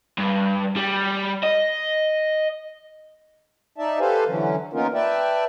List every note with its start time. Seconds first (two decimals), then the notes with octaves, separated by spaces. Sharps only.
0.18 G2
0.77 G3
1.43 D#5
3.78 D#4 D5 E5 A5
4.00 G4 A4 B4 C5 F5 G#5
4.27 D3 E3 F#3 C#4
4.73 A#3 B3 C#4 D#4 F4 A#4
4.94 B4 D5 E5 G5 A5